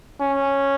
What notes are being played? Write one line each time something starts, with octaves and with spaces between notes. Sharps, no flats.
C#4